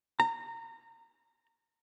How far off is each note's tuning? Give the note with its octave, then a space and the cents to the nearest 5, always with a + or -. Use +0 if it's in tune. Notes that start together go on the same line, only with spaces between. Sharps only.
A#5 -25